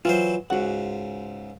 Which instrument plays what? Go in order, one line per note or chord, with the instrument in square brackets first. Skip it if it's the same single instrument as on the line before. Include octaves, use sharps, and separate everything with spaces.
[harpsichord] E3 F#3 C5 [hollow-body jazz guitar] F4
[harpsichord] C#2 G#2 [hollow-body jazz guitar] F#4 F#5